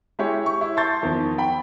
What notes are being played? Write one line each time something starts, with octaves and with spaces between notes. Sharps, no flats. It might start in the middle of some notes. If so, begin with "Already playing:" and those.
G#3 E4 G4 C#5
C#6
E4
A5 C6 C#6 G6 A6
E2 D#3 F3
G5 B5